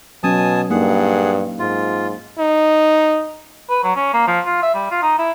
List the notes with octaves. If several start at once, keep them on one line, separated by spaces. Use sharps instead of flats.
B2 F#3 C#4 G#5 A5 D#6
G2 A#3 D#4 G#4 F#5
G#2 F4
D#4
B4
F#3
C#4
A#3
F3
F4
E5
G3
F4
D#4
E4